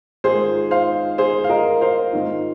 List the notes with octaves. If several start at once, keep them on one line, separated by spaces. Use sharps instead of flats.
G#2 D#3 G#3 F4 G#4 C5
C5 F5
G#4 C5
F5
A#4 D#5
C5 F5
G#2 D#3 C4 F4